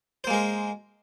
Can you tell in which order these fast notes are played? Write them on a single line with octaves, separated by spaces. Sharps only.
C5 A#3 G#3 A#4